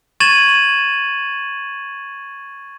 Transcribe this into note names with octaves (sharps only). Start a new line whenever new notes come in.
C#6 G#6 A6 D#7 E7 F#7